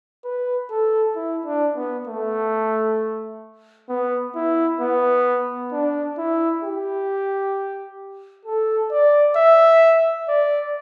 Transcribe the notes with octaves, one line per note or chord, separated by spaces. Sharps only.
B4
A4
E4
D4
B3
A3
B3
E4
B3
D4
E4
G4
A4
D5
E5
D5